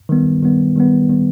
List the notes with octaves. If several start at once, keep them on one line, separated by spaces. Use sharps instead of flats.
D#3 G3 B3
D#3 G3 B3
D#3 G3 B3
D#3 G3 B3